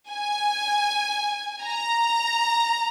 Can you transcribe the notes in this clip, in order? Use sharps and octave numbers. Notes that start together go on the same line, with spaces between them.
G#5
A#5